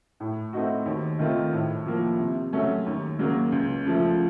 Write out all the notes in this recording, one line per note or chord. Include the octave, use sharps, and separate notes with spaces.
A2
A3 C4 D#4 F#4
D#2
D#3 A3 C4 F4
A2
F3 A#3
C3
F#3 A3 C#4
D#2
C#3 F#3 A#3
C#2
C#3 F3 A3